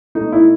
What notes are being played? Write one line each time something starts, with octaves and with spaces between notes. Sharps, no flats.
B2 A3 D#4
E4